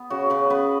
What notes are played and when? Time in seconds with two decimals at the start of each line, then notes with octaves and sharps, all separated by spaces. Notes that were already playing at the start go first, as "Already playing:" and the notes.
Already playing: B3
0.10 C#3 F#4
0.30 C#3 B4
0.50 B3 B4